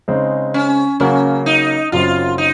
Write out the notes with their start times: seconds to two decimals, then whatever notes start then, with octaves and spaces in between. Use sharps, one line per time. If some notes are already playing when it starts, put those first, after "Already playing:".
0.08 C#3 G#3 C4 D#4
0.54 C#4
1.00 C#3 F#3 A#3 C#4
1.46 D#4
1.92 F#1 F#2 C#3 F#3 C4 F4
2.38 D#4